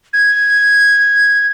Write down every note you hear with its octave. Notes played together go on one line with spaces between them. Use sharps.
G#6